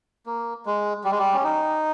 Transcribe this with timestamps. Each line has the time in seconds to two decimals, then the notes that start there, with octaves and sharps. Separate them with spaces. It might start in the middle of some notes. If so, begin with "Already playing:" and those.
0.26 A#3
0.66 G#3
1.04 G3
1.12 G#3
1.19 G3
1.34 C#4
1.44 D#4